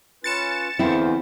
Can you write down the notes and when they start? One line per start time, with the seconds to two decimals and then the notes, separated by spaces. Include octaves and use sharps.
0.24 C#4 F4 B4 A6 C#7 E7
0.79 E2 D3 C4 E4 F4 C5